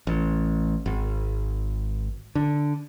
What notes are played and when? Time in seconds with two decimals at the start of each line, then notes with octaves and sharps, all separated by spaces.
0.07 A1
0.86 G#1
2.35 D3